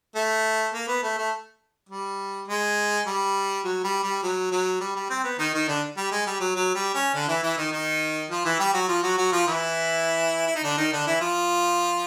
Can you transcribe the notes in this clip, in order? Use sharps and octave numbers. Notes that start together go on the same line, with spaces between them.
A3
A#3
B3
A3
A3
G3
G#3
G3
F#3
G3
G3
F#3
F#3
G3
G3
C4
B3
D#3 D#4
D#3 D#4
D3 D4
G3
G#3
G3
F#3
F#3
G3
C#4
D3 D4
E3 E4
E3 E4
D#3 D#4
D#3 D#4
F3 F4
E3 E4
G3 G4
F#3 F#4
F3 F4
F#3 F#4
F#3 F#4
F3 F4
E3 E4
E4
D#4
D3 D4
D#3 D#4
D3 D4
E3 E4
F3 F4